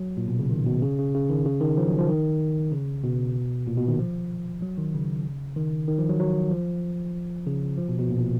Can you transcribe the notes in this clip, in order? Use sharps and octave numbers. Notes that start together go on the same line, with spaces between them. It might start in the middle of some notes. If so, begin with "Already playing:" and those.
Already playing: F#3
A#2
B2
C#3
D#3
B2
C#3
C#3
C#3
D#3
C#3
D#3
F3
F#3
F3
D#3
C#3
B2
A#2
B2
D#3
F3
F#3
D#3
C#3
D#3
D#3
F3
F#3
F#3
F3
C#3
F3
B2
B2
A#2
A#2